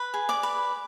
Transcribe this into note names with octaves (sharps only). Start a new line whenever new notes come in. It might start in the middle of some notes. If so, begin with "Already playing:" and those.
Already playing: B4
G#4
D5 D6
B4